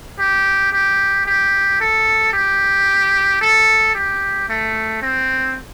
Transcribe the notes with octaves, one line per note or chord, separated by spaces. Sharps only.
G4
G4
G4
A4
G4
A4
G4
A3
C4